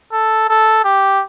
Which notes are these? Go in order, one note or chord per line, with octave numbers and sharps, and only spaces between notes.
A4
A4
G4